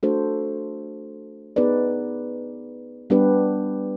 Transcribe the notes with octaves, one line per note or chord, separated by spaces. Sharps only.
A3 D4 F#4 A4 C5
B3 D#4 G#4 B4 D5
G3 B3 D4 G4 B4